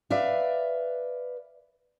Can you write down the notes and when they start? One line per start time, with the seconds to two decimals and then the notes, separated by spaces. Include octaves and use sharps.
0.10 B4 D5 E5 F5